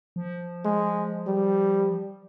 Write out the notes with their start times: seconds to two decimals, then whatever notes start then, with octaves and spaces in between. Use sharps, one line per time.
0.16 F3
0.65 G#3
1.27 G3